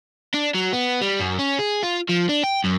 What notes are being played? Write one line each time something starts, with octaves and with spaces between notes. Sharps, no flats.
D4
F#3
B3
G3
F#2
C#4
G#4
F4
F3
D4
G5
F#2